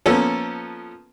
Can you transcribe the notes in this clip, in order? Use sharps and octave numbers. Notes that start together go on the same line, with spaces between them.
F3 A#3 B3 C#4 A4